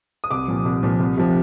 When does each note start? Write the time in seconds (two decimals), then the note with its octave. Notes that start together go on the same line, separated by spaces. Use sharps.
0.24 D#6
0.31 C2 D6
0.48 A#2 F3
0.65 C2
0.83 A#2 F3
1.00 C2
1.17 C3 F3